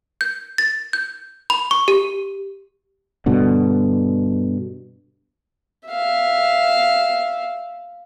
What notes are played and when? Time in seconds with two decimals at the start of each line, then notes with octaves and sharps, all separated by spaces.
0.21 G6
0.58 A6
0.93 G6
1.50 B5
1.71 C#6
1.88 G4
3.26 G2 B2 D3
5.88 E5 F5